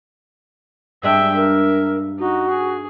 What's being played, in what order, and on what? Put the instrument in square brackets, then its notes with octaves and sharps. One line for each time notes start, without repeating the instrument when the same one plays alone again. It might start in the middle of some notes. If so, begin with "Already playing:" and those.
[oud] G2 G#3 D4 [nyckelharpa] E5 G5
[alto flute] A#4 [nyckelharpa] E5
[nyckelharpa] D#4 [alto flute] F#4
[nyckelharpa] G#4